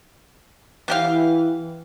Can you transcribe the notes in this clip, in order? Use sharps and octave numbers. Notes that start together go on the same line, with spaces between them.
E3 B3 G4 F5